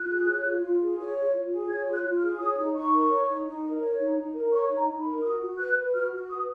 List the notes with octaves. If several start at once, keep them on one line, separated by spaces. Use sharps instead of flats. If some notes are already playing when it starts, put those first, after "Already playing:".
Already playing: F4 F#6
G#4
C#5
F4
F4
G#4
C#5
F4
F4
G#4
C#5 G#6
F4
F#6
F4
F6
G#4
C#5 D#6
D#4
D#4 C#6
A#4
C#5
D#4
D#4
A#4
C#5
D#4
D#4
A#4
C#5 C#6
D#4
A#5
D#4
B5
A#4
F#4 D#6
F#4
B4 F#6
B4
F#4 F6
F#4
B4 D#6